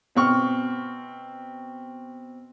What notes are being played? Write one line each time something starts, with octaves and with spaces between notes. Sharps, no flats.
B2 C4 C#6 F6